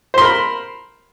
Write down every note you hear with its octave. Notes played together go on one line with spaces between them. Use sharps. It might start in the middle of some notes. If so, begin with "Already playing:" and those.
A#4 C5 B5 C6